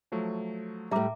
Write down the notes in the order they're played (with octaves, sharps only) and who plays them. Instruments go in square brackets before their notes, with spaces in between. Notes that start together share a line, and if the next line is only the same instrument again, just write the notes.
[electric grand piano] F3 F#3 A3
[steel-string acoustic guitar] A2 G3 [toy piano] E5 A#5 D6